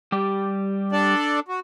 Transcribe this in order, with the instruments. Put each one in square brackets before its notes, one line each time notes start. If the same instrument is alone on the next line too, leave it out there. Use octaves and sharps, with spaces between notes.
[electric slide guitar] G3 G4
[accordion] D4 A4 D5
F#4